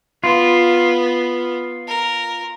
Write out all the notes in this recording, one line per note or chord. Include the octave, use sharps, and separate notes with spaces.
B3 F4
A#4